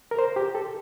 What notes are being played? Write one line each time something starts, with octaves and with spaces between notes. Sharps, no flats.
A#4
C5
G4
A4